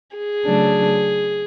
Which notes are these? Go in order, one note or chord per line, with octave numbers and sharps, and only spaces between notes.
G#4
C#3 F#3 A3 D4